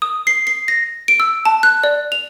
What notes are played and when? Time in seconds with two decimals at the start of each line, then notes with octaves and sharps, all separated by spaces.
0.02 D#6
0.27 C7
0.47 C7
0.68 A#6
1.08 D7
1.20 E6
1.45 A5
1.63 F#6
1.84 D5
2.12 F7